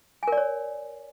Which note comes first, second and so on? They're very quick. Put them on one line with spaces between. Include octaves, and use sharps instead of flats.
G#5 A#4 D5 C#5